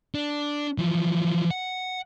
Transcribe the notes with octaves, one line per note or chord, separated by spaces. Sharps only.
D4
E3 F3
F#5